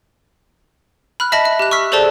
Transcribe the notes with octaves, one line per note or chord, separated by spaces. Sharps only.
B5 F6 F#6
D#5 E5 A5 B5 A#6
E5
G4 F#6
C#6 E6 F6 B6
G#4 A4 C5 D5 A5 G7